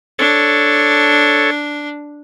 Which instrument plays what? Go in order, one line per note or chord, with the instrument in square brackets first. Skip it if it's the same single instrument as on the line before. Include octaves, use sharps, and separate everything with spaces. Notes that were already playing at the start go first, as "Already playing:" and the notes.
[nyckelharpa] D4 [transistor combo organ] A4 C#5